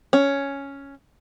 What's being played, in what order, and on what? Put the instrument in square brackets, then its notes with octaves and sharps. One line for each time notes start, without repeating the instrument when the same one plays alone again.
[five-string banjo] C#4